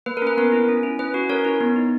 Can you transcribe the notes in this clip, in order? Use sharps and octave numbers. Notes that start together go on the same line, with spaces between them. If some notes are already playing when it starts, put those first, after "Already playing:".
A#3 B4
A#4
C#4 B4
B3 A#4
E4
C#4
E4
C#4 B4
F#4
C#4 A#4 C#5
E4
B3
D#4